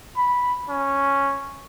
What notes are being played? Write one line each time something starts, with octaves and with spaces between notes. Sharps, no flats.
B5
C#4